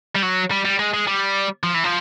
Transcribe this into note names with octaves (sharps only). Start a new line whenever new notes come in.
G3
F#3
G3
G3
G#3
G#3
G3
F3
E3
F3